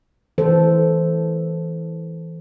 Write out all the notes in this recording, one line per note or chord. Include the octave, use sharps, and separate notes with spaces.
E3 A4 C5